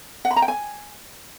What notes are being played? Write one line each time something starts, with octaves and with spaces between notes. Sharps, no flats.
F#5
B5
A#5
G5
G#5